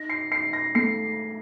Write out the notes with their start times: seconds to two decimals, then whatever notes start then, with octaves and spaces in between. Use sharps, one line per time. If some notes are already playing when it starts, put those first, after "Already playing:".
Already playing: D#4 A#6
0.09 C7
0.31 D#4 C7
0.53 A#6
0.75 A3 C7